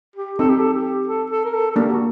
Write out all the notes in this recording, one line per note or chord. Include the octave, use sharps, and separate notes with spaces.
G4
C4 D#4 A4
G4
A4
G4
A4
A4
A#4
A4
A4
A#3 D4 G4
F#4